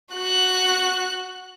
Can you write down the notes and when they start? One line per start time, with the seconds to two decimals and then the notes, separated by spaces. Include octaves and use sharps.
0.14 F#4 F#6